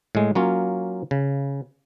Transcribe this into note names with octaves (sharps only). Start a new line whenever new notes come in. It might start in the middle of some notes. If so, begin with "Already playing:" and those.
A2 G#3
F#3 A#3 C#4 F4
C#3